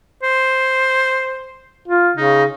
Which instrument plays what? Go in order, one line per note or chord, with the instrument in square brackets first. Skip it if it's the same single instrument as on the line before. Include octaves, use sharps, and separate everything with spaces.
[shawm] C5
[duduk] F4
[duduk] C#3 [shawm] D#4